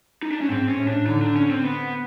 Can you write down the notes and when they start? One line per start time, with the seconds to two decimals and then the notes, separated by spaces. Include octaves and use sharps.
0.23 D#4
0.31 D4
0.41 C#4
0.50 G#2 C4
0.69 C#4
0.78 A2
0.88 D4
1.06 D3 D#4
1.22 D4
1.36 C#4
1.50 C4
1.65 B3